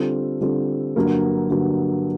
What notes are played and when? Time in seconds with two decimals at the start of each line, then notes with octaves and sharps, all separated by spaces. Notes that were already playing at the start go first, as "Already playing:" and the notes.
Already playing: D3 G3 C4 F4 A4
0.41 D3 G3 C4 F4 A4
0.96 G2 D3 F#3 A#3
1.50 G2 D3 F#3 A#3